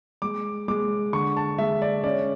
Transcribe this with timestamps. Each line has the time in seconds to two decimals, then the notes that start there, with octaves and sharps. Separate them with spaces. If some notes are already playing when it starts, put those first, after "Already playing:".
0.22 G#3 D6
0.68 G#3 D6
1.13 D3 C#6
1.37 A5
1.58 G#3 E5
1.82 D5
2.04 C#4 D5